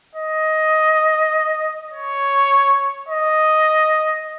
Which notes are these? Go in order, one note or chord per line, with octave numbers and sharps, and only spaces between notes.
D#5
C#5
D#5